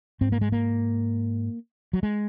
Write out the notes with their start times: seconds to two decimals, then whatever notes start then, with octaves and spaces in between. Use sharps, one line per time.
0.21 G#2 C4
0.32 A#3
0.41 G#3
0.52 A#3
1.93 F#3
2.03 G#3